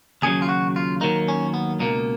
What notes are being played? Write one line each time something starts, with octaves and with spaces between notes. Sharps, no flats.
D#2 C#3 F#3 G#4
F4
F#4
F4
D#2 D#3 F#3 A#3 D#4
C#4
B3
C#2 B2 A#3 D#4